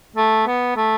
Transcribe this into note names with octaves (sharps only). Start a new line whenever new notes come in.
A3
B3
A3